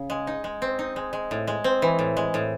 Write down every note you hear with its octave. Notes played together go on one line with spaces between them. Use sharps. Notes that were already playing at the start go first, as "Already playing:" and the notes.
Already playing: C#3
G#3
D#4
G#3
C4
D#4
G#3
G#3
A2
G#3
C4
E3
A2
G#3
A2